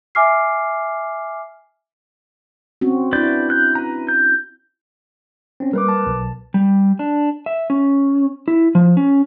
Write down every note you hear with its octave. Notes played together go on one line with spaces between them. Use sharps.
E5 G#5 D6 F6 C7
C4 C#4 F#4
D4 E4 B4 D5 G6
F#6 G6
B4 A#5
G6
C4 C#4
G3 A#3 A#4 B4 D6
A5
B1
G3
D4
E5
C#4
E4
F3
C#4